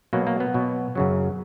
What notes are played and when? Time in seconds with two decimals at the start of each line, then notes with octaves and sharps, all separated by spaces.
0.13 B2 F#3 A#3
0.27 A#3
0.40 B3
0.54 B2 F#3
0.95 F#2 C#3 F#3